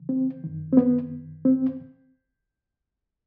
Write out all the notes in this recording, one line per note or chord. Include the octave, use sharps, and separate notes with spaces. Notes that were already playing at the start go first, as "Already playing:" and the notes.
Already playing: C#2 C#3 E3
C4
F#2 D#3
C4
B3
C4